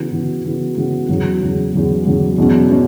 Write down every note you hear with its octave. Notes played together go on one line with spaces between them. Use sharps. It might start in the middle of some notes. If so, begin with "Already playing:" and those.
Already playing: C#3 E3 B3 F#4
C#3 E3 B3 F#4
C#3 E3 B3 F#4
C#3 E3 B3 F#4
E2 C#3 F#3
E2 C#3 F#3
E2 C#3 F#3
E2 C#3 F#3
E2 B2 F#3 C#4
B2 F#3 C#4